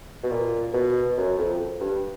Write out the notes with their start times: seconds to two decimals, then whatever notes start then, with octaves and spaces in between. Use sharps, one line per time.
0.23 B2
0.30 A#2
0.73 B2
1.17 F#2
1.38 F2
1.80 G2